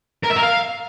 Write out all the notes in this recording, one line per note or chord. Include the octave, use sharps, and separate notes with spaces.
A#4
E5
A#4
F5